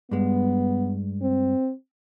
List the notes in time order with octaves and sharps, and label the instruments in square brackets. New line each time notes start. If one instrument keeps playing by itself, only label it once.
[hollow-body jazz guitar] G2 G#3 [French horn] B3
[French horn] C4